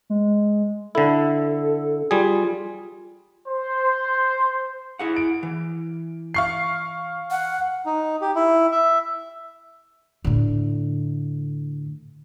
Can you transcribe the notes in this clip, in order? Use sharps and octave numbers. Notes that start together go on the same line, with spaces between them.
G#3
D3 E4 A4
G3 F4 G#4
C5
E4 G#4 F#5
D7
E3
F5 C#6 C7
F#5
D#4
G4
E4
E5
A2 D3